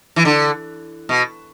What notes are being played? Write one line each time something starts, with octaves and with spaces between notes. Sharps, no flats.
E3
D3
B2